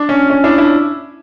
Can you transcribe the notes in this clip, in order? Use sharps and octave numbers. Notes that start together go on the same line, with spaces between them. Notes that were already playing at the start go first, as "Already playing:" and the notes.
Already playing: D4
C#4
C#4
D4 E4
D4 E4